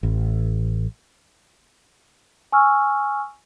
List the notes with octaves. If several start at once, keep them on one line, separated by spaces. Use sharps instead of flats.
A1
G#5 C#6 E6 F6